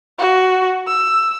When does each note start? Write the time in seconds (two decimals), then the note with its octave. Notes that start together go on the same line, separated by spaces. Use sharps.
0.19 F#4
0.87 E6